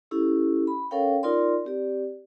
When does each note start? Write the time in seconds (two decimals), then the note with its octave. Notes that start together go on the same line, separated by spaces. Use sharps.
0.11 C#4 E4 G4 A4
0.67 B5
0.91 C#4 A4 A#4 C#5 F5 G5
1.23 D#4 F4 A#4 D5 C6
1.65 C4 G4 D5